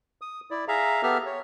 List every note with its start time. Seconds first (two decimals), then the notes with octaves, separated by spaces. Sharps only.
0.22 D#6
0.51 E4 D5
0.68 G#4 E5 F5 A#5
1.03 B3 G4 A4 E5 F6
1.26 C#5